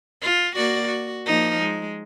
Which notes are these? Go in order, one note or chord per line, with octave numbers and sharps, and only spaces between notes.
F4
A#3 F#4 D5
F#4
F3 A#3 D#4
G#3